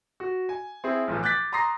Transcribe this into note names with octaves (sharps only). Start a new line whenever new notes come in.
F#4
G#5
C4 E4 G#4
B1 A2 E3 F3
D6 F#6 G6 A6 B6
A#5 C6 D#6 A#6 C7